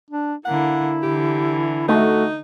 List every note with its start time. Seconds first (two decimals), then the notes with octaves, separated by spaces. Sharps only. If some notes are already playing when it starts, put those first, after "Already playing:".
0.11 D4
0.45 D3 A#3 E4 F#5
1.02 D3 E3 G4
1.89 A3 D#4 F#4